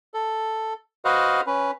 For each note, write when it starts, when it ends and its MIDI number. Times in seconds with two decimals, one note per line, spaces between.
0.14 0.73 69
1.05 1.41 66
1.05 1.41 71
1.05 1.41 72
1.05 1.41 75
1.05 1.41 77
1.05 1.41 78
1.47 1.71 61
1.47 1.71 71